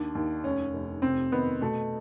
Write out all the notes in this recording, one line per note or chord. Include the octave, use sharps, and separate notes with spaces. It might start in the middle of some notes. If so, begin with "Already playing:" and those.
Already playing: D#2 D4
D#2
F1 C#4
F1
C3 C4
D#3 B3
B2 A3